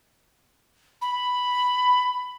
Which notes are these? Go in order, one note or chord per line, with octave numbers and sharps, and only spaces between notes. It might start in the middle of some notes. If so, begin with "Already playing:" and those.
B5